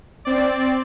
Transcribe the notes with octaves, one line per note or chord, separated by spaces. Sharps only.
C4 D5